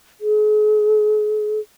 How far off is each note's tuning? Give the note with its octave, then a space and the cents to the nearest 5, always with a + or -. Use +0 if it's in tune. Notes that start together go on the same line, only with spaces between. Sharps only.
G#4 +40